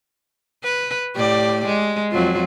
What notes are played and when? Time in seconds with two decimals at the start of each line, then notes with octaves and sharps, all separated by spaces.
0.63 B4
1.16 A2 G4 D5
1.66 G#3
2.11 F2 F#3 F4